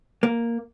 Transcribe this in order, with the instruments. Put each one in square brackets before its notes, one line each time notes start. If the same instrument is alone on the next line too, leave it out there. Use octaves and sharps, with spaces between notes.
[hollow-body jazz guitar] A#3